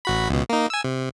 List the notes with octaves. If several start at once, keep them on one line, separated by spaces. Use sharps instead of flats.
A1 F#4 B5
C#2 B2
A#3 D#4
G#5 E6
C3